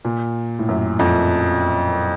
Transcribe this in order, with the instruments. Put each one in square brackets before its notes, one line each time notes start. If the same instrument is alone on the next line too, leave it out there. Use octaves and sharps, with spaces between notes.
[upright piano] A#2
A2
F#2
F2